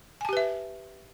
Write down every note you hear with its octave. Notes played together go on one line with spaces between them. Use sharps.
G4 B4 E5 G#5 A5